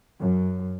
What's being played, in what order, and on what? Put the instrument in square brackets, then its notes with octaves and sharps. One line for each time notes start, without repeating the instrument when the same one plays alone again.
[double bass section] F#2